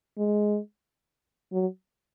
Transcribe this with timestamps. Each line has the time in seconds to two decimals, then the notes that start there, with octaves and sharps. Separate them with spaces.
0.18 G#3
1.53 F#3